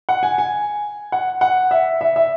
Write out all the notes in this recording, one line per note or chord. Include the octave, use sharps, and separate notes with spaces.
F#5
G#5
G#5
F#5
F#5
E5
E5
E5